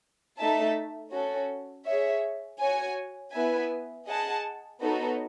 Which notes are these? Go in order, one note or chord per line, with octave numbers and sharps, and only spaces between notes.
A3 D#4 A4 E5 A5
C#4 F#4 A4
G#4 C#5 E5
F#4 C#5 G#5
B3 E4 B4 E5 G#5
G#4 D#5 F#5 A5
B3 D#4 F#4 A4 C#5